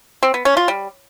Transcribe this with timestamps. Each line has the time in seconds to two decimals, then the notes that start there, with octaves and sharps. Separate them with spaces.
0.23 C4
0.34 B3
0.45 C#4
0.57 F4
0.68 G3